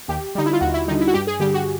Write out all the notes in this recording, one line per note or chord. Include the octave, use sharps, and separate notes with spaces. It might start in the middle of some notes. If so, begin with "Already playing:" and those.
D#2 G4
D3 G3 D#4
E4
F4
D#2 F#4
E4
D3 G3 D#4
E4
F#4
G2 G4
G#4
D3 G3 G4
F#4